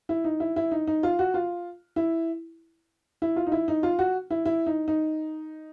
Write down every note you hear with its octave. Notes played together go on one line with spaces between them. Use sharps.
E4
D#4
E4
E4
D#4
D#4
F4
F#4
F4
E4
E4
F4
D#4
E4
D#4
F4
F#4
E4
E4
D#4
D#4